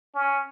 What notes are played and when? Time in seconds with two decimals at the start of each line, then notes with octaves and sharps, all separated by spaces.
0.15 C#4